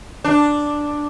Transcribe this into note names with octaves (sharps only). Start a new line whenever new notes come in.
D4